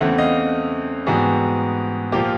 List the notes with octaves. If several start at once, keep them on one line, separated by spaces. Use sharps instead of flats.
E2 C#3 E3 A3 C4 E5 F#5
D#5 F5
G#2 E3 G3 B3 F#4 G#4
A#2 F3 A#3 F4 G4